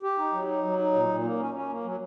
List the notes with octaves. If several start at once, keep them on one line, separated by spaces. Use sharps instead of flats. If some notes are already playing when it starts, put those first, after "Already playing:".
G4
D#4
F#3
D#4
F#3
D#4
A#2
A#2
A#3
C#4
C#4
A#3
F#3